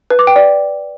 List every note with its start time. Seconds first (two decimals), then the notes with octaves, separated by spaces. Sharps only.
0.10 B4
0.19 D6
0.27 G5
0.36 D5